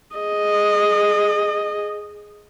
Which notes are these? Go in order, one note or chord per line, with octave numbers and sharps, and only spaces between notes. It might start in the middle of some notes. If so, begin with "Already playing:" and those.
G#4 D#5